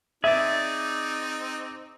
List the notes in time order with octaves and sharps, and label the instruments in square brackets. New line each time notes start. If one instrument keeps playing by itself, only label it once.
[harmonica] C4 D#4 [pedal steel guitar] G#4 D5 [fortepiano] E5